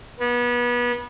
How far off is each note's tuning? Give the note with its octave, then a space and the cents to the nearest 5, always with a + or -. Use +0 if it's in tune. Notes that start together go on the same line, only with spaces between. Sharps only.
B3 -30